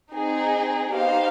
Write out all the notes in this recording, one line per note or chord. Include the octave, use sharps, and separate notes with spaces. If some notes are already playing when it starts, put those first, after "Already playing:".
C4 D#4 G#4
B3 D#4 G4 C5 F5